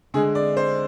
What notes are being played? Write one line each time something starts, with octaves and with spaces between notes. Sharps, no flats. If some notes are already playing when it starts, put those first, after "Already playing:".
D3 G#3 G#4
D5
C5